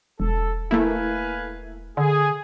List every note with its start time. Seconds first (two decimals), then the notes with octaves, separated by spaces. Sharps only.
0.20 E1 A4
0.71 A3 A#3 E4 B4 F5 G#5
1.97 D3 G#4